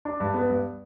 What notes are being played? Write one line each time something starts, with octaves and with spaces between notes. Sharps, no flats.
D4
G2
B3
G2